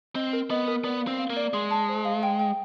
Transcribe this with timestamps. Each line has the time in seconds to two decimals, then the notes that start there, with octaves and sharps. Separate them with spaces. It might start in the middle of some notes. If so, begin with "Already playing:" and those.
0.15 C4 D#5
0.33 A#4
0.50 B3 D#5
0.68 A#4
0.84 B3 D5
1.02 F5
1.07 C4
1.19 F5
1.30 A#3
1.37 D5
1.53 G#3 C6
1.71 A5
1.89 C5
2.05 F5
2.23 G5
2.40 G5